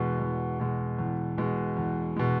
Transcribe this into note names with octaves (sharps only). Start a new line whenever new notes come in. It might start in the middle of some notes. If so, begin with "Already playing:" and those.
Already playing: E2 B2 G#3
E2
B2 G#3
E2
B2 G#3
E2
B2 G#3